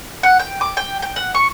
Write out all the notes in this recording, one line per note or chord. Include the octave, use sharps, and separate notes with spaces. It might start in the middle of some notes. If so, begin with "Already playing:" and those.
F#5
G5
D6
G5
G5
F#5
C#6